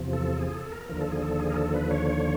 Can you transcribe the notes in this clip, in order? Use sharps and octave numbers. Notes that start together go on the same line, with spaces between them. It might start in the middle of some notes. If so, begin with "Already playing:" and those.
Already playing: E2 C3 F3
A4
G#4
A4
A#4
D#2 D3 F3 A#4
A4
G#4
A4
G#4
A#4
A4
B4
C#5